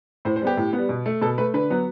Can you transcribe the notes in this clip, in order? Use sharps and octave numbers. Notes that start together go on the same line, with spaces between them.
A2 C5
C5
G3 B3 G4
A2
B3
G3
B2
A3
B2 A4
A3 B4
D3 B4
F#3 B3